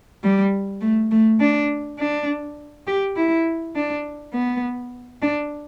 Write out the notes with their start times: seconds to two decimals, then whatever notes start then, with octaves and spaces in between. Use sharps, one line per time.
0.24 G3
0.82 A3
1.11 A3
1.41 D4
1.99 D4
2.87 G4
3.17 E4
3.76 D4
4.34 B3
5.22 D4